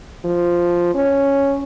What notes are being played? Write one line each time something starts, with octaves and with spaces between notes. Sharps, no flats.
F3
C#4